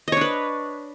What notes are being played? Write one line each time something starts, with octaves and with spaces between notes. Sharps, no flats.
D4 B4 C#5 D#5